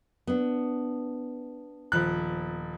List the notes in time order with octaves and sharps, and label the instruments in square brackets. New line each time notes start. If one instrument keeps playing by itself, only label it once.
[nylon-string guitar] B3 D4
[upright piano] D#1 F3 F#6